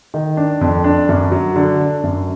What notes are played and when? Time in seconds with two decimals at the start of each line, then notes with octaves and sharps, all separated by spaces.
0.14 D#3
0.37 D4
0.61 F2
0.84 D4
1.09 F#2
1.32 F#3
1.56 D3
1.80 D4
2.03 F#2